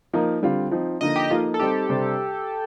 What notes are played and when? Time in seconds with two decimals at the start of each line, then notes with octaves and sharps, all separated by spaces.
0.13 F3 A#3 D#4 A#4
0.42 D3 G3 C4 F4
0.71 F3 C4 D#4
1.01 D3 F3 A#3 D#4 D#5
1.16 G4
1.30 F3 A#3 D#4 F4 A4
1.54 A4
1.60 G3 C4 D#4 G4
1.89 C3 G3 D4 G4 C5